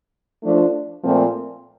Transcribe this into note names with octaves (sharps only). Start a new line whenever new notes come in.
F3 A3 D4
A#2 F3 A3 C4